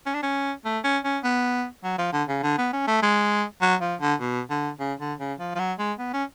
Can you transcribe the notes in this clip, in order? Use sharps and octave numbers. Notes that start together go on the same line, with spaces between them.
C#4
D4
C#4
A3
C#4
C#4
B3
F#3
F3
D3
C#3
D3
B3
C#4
A3
G#3
F#3
F3
D3
B2
D3
C#3
D3
C#3
F3
F3
F#3
G#3
B3
C#4